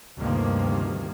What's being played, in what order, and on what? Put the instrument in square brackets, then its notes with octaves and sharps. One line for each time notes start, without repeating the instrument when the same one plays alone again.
[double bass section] D2 G2 C3 D#3 F3 A#3